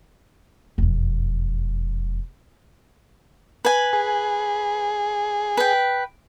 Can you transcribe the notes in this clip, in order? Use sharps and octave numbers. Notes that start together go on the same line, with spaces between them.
E1 F2
B4 G#5
G#4
B4 G5